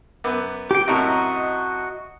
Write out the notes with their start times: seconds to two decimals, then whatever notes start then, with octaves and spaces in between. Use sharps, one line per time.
0.24 F#2 B3 D6
0.71 G4 G5
0.88 F#2 A2 C3 F#4 D#5 A#5